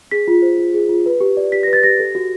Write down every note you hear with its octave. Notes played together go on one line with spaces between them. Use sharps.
G#4 B6
F4
C5
F4
G#4
F4
B4
G4
D5
G4 B6
B4 A#6
A6
G4 A#6
A4
F#4